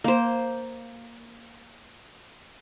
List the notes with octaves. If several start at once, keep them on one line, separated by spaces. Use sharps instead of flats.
A#3 C5